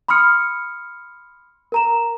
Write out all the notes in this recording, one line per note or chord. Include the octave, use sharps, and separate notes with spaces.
B5 C6 D#6 F6 C#7
A#4 A#5 E7